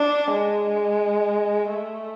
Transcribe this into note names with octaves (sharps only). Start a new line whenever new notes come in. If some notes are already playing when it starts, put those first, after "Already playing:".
Already playing: D4
G#3
A3